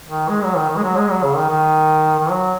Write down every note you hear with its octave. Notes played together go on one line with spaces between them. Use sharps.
D#3
G#3
F#3
D#3
D#3
G#3
F#3
G#3
F#3
C#3
D#3
D#3
D#3
F#3